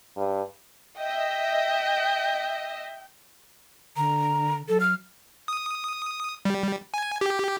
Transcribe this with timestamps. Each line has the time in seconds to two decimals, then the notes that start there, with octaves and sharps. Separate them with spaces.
0.16 G2
0.98 D#5 E5 G5
3.97 D3 A#5
4.69 F#3 A4
4.80 F6
5.48 D#6
6.45 G3
6.94 G#5
7.21 G4